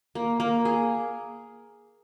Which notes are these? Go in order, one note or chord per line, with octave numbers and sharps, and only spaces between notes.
A#3
A#3
G#4